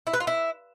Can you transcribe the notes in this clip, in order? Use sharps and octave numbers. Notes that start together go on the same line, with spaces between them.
E4
B4
F4
E4